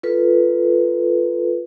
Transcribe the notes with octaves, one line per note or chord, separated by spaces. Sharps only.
F4 A4 B4